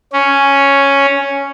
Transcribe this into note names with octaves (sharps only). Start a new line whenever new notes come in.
C#4